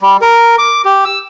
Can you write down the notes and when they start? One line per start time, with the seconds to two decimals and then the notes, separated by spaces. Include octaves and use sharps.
0.01 G3
0.21 A#4
0.58 D6
0.85 G4
1.05 E6